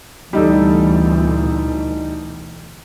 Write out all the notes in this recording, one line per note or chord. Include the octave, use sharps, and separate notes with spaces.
D2 B2 E3 G3 D#4 A4